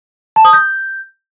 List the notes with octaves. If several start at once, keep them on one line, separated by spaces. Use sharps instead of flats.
A5
D#6
G6